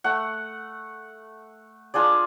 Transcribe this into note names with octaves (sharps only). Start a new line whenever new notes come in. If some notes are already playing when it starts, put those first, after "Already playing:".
A3 F#5
D4 F4 G#4 D5